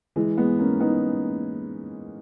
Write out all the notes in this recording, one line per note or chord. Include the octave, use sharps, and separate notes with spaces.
E3 G#3
G#3 B3
A#3 C#4
B3 D#4